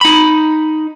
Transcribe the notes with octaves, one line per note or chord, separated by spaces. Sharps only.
D#4 B5